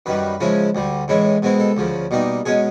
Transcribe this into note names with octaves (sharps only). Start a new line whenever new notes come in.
F#2 D#3 G3 B4
C#3 F3 G#3 C#4 E4
D2 D3 G3
A2 E3 G#3 C#4 E4
B2 G#3 C4 E4
A4
D2 C#3 F3
B2 G3 A#3 D#4
B2 G#3 C#4 G#4